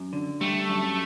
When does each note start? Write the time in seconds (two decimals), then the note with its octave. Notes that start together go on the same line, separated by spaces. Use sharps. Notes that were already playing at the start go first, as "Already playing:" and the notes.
Already playing: F#2
0.13 D3
0.41 G3 A3
0.70 F#2